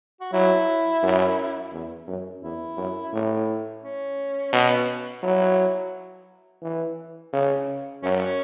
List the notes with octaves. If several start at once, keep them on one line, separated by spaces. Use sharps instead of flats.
F#4
F#3 E4
F#2
E2
F#2
E2 E4
F#2
A2
C#4
B2
F#3 E4
E3
C#3
F#2 C#4
C#4